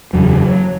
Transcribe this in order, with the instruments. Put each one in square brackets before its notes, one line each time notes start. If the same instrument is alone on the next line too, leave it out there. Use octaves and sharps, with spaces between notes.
[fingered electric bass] F#1 E2 C#3 F#3